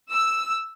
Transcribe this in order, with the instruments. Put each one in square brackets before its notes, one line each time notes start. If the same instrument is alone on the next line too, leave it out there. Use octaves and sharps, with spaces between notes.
[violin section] E6